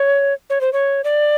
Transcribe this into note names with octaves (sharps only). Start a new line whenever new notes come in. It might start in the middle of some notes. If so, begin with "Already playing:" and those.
Already playing: C#5
C#5
C5
C#5
D5